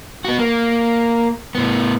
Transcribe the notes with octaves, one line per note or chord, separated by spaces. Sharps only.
B3 F#4
A#3
A2 B3